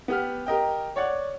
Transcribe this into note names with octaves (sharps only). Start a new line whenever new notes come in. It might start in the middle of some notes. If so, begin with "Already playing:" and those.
B3 G4 F6
G4 A#4 D#5 G5
C#5 D5 F#5